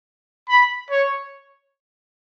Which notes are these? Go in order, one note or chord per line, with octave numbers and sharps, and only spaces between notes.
B5
C#5